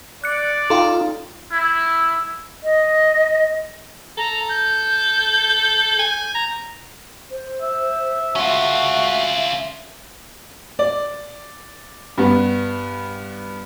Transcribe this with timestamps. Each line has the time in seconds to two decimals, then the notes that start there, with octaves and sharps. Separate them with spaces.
0.24 D5 F#6 C#7
0.70 D#4 F4 A4 F5 G5
1.52 E4
2.63 D#5
4.18 A4 A#5
4.49 G6
5.99 G#5
6.35 A#5
7.31 C5
7.61 E5
8.36 C#4 F4 F#4 E5
10.79 D5
12.18 G2 B3